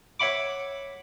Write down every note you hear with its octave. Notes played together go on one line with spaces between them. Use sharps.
C#5 E5 F#5 B5 D6